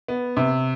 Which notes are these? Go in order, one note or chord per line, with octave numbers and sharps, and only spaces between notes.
B3
C3